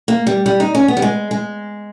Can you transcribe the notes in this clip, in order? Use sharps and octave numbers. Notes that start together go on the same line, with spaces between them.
A#3
G3
G3
D#4
C#4
B3
G3
G#3
G#3